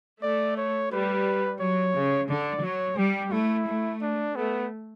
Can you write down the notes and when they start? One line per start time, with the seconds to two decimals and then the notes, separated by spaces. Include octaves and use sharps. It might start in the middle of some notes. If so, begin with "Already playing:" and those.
0.22 A3 D5
0.57 C#5
0.91 G3 B4
1.60 F#3 C#5
1.95 C#3
2.29 D3 D5
2.63 F#3 C#5
2.98 G3 G4
3.32 A3 E4
3.67 A3
4.02 D4
4.36 A3 B3